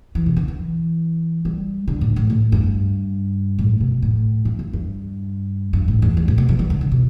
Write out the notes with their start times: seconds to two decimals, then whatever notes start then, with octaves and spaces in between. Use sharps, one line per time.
0.15 E3
0.26 B2
0.36 D3
0.48 E3
1.45 G3
1.88 D3
2.01 A2
2.16 A2
2.30 A2
2.52 G2
3.58 A2
3.81 B2
4.02 A2
4.45 G2
4.59 E2
4.73 G2
5.73 G2
5.88 A2
6.02 E2
6.17 G2
6.28 A2
6.38 B2
6.49 E3
6.59 G3
6.70 D3
6.81 D3
6.92 B2